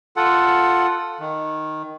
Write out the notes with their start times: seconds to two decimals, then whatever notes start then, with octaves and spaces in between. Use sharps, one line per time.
0.17 F4 A4 F#5
1.20 D#3